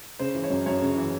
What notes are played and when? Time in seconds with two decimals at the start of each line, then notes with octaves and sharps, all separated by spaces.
0.19 C#3 C5
0.35 E3
0.44 C#5
0.50 F#2
0.66 F#2 C#5
0.82 C#3
0.97 E3